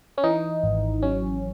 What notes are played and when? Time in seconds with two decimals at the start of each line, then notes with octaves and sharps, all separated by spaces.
0.18 C#4
0.24 E3 D#4
0.63 G#1
1.02 F#3 C#4